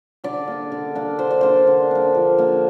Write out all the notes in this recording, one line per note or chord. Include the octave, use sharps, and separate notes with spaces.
D3 D5
A#3 D4
D3
A#3 D4
D3 C5
D5
A#3 D4 C5
D3
A#3 D4
F3
A#3 D4